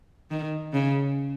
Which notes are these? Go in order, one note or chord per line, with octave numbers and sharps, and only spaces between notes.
D#3
C#3